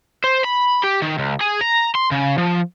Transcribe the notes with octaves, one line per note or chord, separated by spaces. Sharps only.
C5
B5
G4
D#3
C#2
G#4
A#5
C6
C#3
F3